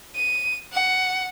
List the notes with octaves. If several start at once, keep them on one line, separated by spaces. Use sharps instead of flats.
D#7
F#5